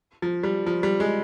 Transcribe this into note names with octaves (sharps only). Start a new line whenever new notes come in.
F3
G3
F3
G3
G#3